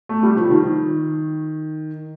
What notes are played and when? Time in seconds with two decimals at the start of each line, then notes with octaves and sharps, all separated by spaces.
0.09 A3
0.23 G3
0.37 F3
0.50 D#3